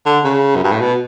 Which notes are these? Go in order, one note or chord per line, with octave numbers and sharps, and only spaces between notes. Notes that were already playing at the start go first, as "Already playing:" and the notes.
D3
C#3
F#2
G2
A2
B2